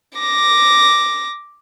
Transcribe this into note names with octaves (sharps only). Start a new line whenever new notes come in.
D6 A#6